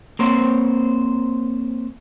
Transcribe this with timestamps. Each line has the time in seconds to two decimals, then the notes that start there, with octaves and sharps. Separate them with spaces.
0.19 A#3 C4 C5 C#5